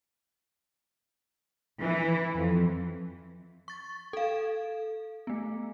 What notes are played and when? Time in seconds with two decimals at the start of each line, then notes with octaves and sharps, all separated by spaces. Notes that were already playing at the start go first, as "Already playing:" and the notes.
1.81 E3
2.36 F2
3.68 C#6 A6
4.13 A4 F5
5.27 A3 B3